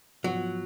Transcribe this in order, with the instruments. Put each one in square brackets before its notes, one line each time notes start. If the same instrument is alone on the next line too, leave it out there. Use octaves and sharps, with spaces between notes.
[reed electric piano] G#2 F3 B3 F4 [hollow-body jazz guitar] F#3